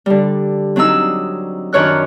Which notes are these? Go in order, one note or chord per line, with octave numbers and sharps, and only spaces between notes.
D3 G3
F#3 C4 D4 D#4 E6
F#2 D#3 D4 C#5 F6 F#6